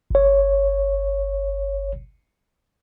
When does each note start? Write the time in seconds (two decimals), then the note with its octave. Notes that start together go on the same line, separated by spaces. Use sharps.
0.11 G1 C#5